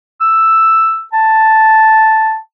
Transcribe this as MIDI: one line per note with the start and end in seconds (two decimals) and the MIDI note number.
0.21 1.02 88
1.13 2.36 81